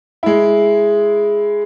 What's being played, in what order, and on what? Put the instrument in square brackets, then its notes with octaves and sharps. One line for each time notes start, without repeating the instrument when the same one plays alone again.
[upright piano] G#3 E4